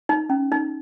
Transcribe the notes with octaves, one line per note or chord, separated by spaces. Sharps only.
D#4
C#4
D#4